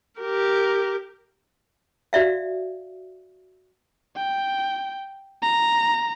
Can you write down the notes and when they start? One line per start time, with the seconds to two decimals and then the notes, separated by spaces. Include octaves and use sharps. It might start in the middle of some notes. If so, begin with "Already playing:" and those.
0.20 G4 A#4
2.13 F#4 D5 E5 F5
4.17 G5
5.43 A#5